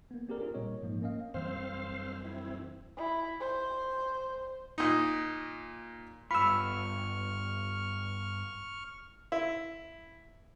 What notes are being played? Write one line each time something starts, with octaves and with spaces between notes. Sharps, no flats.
A#3 B3
C4 G4 G#4 A#4 D5
C4 D4 F4 G#4 A#4
A#2 G3 C#5 D#5
G#2 F3 A#3
A#3 C#4 D#5 F5
F#2 E3 G3 C4 C5 F5
C4 E4
E4
C5
A#2 D#4
G2 B3 F4 B5 C#6 E6 F6
E4